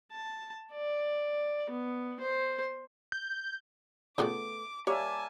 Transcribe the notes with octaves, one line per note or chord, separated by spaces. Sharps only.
A5
D5
B3
C5
G6
C#3 F3 A3 B3 F4 G4 D6
G3 A#3 C#5 E5 G#5 A5